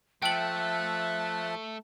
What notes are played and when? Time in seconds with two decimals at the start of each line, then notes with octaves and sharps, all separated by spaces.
0.22 F3 A3 E5 G5 A5 F#6 F#7